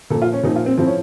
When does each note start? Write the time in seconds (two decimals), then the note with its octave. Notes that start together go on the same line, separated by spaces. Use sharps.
0.10 A#2 A4
0.14 F3
0.22 F4
0.33 C#4
0.43 A#2 F3 D#4
0.56 F4
0.66 C4
0.77 A2 F3 C4
0.87 C#4